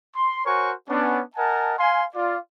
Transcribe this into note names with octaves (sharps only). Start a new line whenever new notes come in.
C6
F#4 A#4 C5 C#5 G#5 C#6
B3 C#4 D4
A#4 D#5 F#5 G#5 A5
F5 G#5 C6
F4 D5